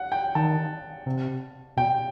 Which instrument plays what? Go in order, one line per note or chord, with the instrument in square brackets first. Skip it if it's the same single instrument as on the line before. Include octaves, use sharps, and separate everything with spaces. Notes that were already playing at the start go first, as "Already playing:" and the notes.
Already playing: [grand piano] F#5
G5
[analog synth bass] D#3 [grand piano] A5
[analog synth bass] C3
[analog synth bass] B2 [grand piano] G5